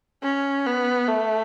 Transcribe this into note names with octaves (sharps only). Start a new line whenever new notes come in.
C#4
B3
A3